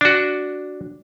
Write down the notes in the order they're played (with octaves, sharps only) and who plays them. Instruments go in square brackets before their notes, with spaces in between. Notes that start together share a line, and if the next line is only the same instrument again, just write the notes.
[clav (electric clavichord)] D4 F#4